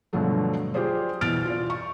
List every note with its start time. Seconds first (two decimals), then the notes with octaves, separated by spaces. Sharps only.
0.13 G2 B2 D3 F3 F#3 A3
0.74 F4 G4 G#4 C5 D5
1.21 B2 E3 F6 A6 D7
1.45 F4 D5
1.70 C#6